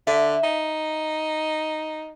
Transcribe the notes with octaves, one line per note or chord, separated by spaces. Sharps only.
D3 E5
D#4